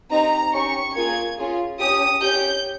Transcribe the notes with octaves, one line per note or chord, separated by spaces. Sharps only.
C4 D#4 G4 A#5
C#4 G4 C#6
A#3 F4 G#4 G#6
C#4 F4 G#4
C#4 G4 D#6
C#4 G4 G6